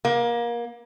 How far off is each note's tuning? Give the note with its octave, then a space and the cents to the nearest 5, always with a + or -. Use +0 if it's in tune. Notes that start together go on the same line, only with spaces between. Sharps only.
A#3 +25